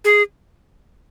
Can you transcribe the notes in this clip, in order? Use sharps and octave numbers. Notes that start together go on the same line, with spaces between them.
G#4